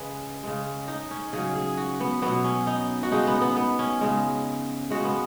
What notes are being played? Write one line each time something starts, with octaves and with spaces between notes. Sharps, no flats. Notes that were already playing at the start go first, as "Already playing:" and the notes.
Already playing: C#3 G#3 G#4 B4
C#3 G#3
D#4
C#4
C#3 F#3 G#4
G#4
F#4
B3
B2 F#3 B3
C#4
D#4
F#4
C#3 G#3 D#4
B3
B3
B3
C#4
C#3 G#3
C#3 G#3 F#4
B3